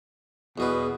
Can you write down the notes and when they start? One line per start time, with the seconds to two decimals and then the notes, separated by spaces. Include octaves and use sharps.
0.58 E2 B2 G#4 B4